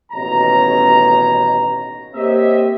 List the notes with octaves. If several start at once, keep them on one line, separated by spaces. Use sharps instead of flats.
A1 D#2 B2 C#5 A#5
A#3 C4 G4 C#5 D#5 E5